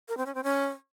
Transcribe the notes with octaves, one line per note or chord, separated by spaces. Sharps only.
A#4
C4
C#4
C4
C#4